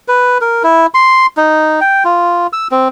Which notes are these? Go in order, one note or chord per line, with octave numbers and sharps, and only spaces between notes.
B4
A#4
E4
C6
D#4
G5
F4
E6
C4